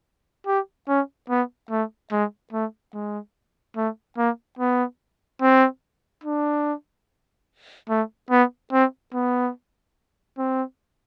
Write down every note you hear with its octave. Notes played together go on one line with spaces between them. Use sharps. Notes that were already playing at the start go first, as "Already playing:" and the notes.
G4
C#4
B3
A3
G#3
A3
G#3
A3
A#3
B3
C4
D4
A3
B3
C4
B3
C4